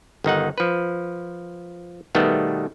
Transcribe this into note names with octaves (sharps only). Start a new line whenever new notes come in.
G1 D#3 D#4 F#5
F3 B4
B2 D#3 G3 A3 B3